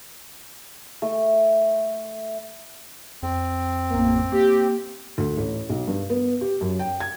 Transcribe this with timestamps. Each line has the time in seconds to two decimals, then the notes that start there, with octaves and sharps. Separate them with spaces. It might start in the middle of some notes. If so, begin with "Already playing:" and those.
1.02 A3
3.23 F2 C4
3.89 A1 A#3
4.32 A#3 G4
5.18 D2
5.37 A1
5.69 B1
5.87 G2
6.10 B3
6.41 G4
6.61 F#2
6.79 G5
7.00 G#6